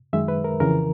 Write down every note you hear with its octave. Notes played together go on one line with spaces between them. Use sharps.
F#2 D#3 G#3 E5
B4
A#4
F2 C#3 E3 A#4